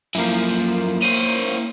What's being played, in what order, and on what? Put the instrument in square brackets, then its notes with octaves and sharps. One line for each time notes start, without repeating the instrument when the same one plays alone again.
[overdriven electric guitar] F#2 F3 [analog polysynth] A#3 E4
[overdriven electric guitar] C#4 C5 [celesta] D#7